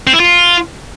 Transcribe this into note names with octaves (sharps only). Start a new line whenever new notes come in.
C4
E4
F4